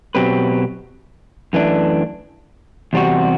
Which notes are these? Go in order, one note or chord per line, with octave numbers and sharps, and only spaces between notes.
B2 F#3 C4 G4 B4
F#2 E3 A3 D4
E2 C3 G3 C4 F#4